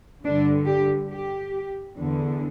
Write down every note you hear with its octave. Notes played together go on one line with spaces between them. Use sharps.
G2 D3 D4
G4
G4
E2 D3